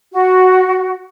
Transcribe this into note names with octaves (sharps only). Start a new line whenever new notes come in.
F#4